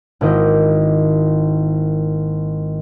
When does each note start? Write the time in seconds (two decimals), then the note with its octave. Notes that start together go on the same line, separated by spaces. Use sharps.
0.21 G#1 D#3 A#3 E4 D#5 G6